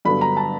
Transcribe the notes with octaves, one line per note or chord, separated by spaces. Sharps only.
G2 D3 F#3 B3 D4 B5
A#5
A5